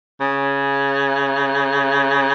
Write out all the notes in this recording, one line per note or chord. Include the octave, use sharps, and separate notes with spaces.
C#3